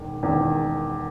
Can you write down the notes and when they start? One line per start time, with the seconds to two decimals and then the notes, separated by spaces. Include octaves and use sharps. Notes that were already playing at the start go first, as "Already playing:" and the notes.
Already playing: E1 E2 D#3
0.23 E1 E2 D#3